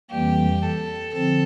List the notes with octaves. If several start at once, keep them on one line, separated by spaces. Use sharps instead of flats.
F2 E3 G3 A#3 G4
A4
D3 F3 C4 A4